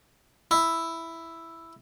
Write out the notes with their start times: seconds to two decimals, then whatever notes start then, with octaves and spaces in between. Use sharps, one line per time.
0.51 E4